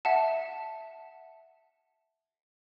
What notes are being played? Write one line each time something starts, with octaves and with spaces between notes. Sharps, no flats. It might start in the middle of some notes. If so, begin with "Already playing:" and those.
E5 F#5 A5